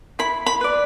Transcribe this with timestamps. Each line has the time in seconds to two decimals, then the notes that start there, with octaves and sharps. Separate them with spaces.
0.19 E4 B5
0.46 B5
0.61 B4 D5